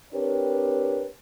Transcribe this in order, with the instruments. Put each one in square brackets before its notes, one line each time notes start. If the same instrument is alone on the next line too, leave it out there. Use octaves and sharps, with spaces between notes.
[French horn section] C4 D4 G4 A#4 B4 C#5